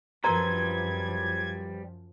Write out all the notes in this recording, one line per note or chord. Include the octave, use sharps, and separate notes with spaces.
F#2 F3 G3 A#4 B4 A#5 C6 G#6